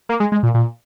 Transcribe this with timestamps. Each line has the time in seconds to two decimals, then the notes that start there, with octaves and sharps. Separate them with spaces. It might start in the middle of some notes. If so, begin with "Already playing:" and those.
0.09 A#3
0.20 G#3
0.32 G#3
0.43 A#2
0.54 A#2